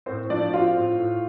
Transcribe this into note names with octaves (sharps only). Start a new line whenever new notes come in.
A2 C4 C5
F3 D4 D5
C4 F4 F5
A2
A2